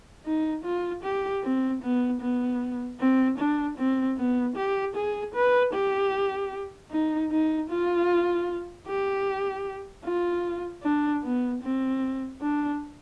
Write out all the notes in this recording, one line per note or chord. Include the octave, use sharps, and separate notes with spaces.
D#4
F4
G4
C4
B3
B3
C4
D4
C4
B3
G4
G#4
B4
G4
D#4
D#4
F4
G4
F4
D4
B3
C4
D4